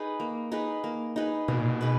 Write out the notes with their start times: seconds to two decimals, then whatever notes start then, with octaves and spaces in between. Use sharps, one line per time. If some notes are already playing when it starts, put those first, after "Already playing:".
Already playing: D#4 G#4 B4
0.20 A#3
0.52 D#4 G#4 B4
0.84 A#3
1.16 D#4 G#4 B4
1.48 B2 A#3
1.58 A#2
1.68 B2
1.81 D#4 G#4 B4